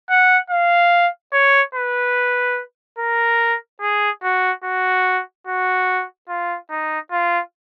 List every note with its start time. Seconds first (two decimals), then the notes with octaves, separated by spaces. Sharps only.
0.10 F#5
0.50 F5
1.33 C#5
1.75 B4
2.99 A#4
3.81 G#4
4.23 F#4
4.64 F#4
5.47 F#4
6.29 F4
6.71 D#4
7.12 F4